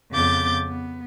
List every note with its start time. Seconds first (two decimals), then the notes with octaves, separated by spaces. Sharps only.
0.12 F2 C#3 B3 D6 G6 A6
0.68 B3